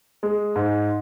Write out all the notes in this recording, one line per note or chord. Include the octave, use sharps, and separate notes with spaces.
G#3
G#2